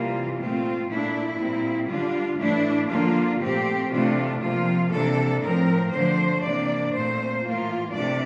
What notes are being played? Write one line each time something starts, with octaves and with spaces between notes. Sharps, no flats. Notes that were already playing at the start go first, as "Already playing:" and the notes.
Already playing: C3 E3 G3 A#3 F4
A#2 A3 C4 F4
A#2 A3 D4 E4
A#2 G3 C4
D3 G3 D4 F4
A2 E3 A3 D4 E4
D3 F3 A#3 D4 F4
A#2 A3 C4 G4
C3 E3 A3 D4 F4
C3 F3 A#3 F4
C3 E3 A#3 D4 A4
A2 F3 C4 A#4
D3 F3 A3 D4 C5
C3 E3 A#3 D4 D5
A#2 A3 C4 C5
A2 E3 A#3 F4
C3 E3 A3 D4 D5